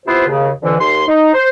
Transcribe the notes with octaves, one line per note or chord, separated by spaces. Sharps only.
C3 B3 E4 F4 B4 C5
D#2 C#3
F2 D3 E3
D#2 C6
D#4
C5